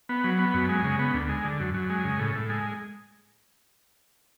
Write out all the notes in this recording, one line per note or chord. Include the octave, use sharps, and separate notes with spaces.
B3
F#3
B3
F#2
G#3
C#3
B3
D2
G#3
D3
F#2
F#2
G#3
C#3
A2
A2
G#3